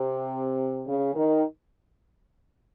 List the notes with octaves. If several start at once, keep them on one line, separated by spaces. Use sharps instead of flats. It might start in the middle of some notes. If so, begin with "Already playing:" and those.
Already playing: C3
C#3
D#3